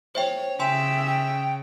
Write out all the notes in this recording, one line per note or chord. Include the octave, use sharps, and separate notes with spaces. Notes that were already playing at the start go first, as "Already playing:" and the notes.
C5 C#5 E5 G5
C#3 E5 G5 G#5 C6
G5